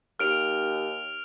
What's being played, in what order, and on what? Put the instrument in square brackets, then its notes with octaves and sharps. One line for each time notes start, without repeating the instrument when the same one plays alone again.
[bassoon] D#2 [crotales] F6 D7 F7